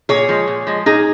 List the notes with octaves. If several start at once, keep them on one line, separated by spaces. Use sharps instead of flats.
A#2 G#4 C#5
F3 G#3
A#2
F3 G#3
A#2 D#4 G#4